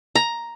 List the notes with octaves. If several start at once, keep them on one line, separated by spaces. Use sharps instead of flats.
A#5